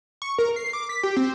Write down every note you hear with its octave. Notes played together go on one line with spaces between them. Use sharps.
C#6
A#4
C7
D6
B6
G4
C4